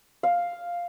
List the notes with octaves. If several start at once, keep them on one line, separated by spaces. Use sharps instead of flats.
F5